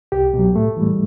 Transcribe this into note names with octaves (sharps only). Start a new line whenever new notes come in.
C2 G4
B2 F#3
A2 A3
E3 G3